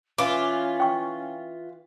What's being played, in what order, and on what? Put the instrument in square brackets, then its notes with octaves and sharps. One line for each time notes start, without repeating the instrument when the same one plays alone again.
[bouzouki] E3 F4 [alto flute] C#4 [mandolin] D6
[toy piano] G5 C#6